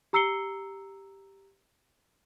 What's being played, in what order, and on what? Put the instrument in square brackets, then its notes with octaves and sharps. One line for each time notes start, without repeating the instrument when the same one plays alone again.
[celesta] G4 A#5 E6 C7 C#7 G7